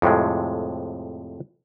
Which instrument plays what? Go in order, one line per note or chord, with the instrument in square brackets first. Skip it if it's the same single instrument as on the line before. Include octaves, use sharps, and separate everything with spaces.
[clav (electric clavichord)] F2 A2 C3 G#3